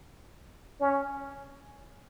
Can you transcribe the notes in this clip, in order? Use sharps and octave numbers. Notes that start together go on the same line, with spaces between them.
C#4